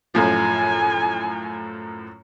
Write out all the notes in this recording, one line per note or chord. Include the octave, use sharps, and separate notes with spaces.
F#2 A2 F3 G#5